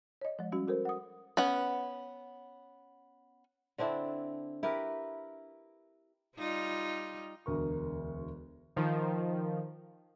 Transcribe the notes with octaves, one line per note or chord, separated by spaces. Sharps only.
C#5 D#5
F3 G#3
G3 C#4 F#4
F#4 A4 A#4 C5
F#5 D#6
B3 C#4 F#5
D3 C4 D4 E4
E4 G4 A#4 B4
G3 D#4 F4
E1 D2 A#4 C#6
D#3 F3